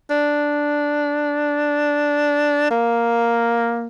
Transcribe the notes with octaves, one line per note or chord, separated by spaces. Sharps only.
D4
A#3